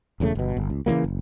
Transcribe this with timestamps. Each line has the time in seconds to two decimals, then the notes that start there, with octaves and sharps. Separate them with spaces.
0.20 E1 E2 C#3 A3
0.35 G1 B2
0.57 G1
0.70 C#2
0.86 C#3 E3 F#3 A#3
1.04 F#1